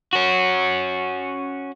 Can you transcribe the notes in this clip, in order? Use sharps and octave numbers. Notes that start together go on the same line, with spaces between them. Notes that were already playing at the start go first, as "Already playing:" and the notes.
C#4 F#4